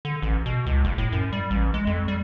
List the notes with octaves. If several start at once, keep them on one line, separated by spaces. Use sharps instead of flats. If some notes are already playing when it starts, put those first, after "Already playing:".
D3
A1
B2
C#2
F#1
A2
F#2
G3
A1
G#3
F2
G3